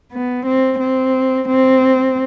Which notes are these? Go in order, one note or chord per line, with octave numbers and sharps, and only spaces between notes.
B3
C4
C4
C4